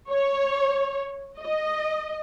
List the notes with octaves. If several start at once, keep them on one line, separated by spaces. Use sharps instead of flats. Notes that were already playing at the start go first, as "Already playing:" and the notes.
C#5
D#5